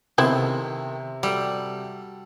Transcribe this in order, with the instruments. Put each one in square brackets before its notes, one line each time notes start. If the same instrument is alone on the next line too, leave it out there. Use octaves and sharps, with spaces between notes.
[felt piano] C3 [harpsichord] D#3 A4 C5 [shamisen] B3 C4 E4
[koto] G3 [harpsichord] F#4 A4